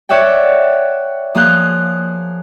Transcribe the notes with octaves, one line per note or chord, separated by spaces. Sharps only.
C#5 D5 E5 F#5 G5
F3 A#3 G#4 F5 F#6 G6